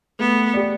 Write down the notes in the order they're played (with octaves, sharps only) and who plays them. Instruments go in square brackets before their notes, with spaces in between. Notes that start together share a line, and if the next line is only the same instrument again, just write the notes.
[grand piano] A3 [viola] B3
[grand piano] G4 D5